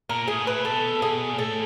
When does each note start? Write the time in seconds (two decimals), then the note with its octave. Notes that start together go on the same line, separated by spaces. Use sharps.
0.09 A#2 A#4
0.28 A2 G#4
0.39 A#2
0.47 A2 B4
0.65 B2 A4
1.02 B2 G#4
1.33 A#2
1.38 A2 A4